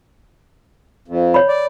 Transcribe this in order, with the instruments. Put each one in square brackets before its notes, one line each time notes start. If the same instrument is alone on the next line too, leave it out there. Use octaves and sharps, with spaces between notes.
[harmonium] F2
[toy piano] C#5 B5
[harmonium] D5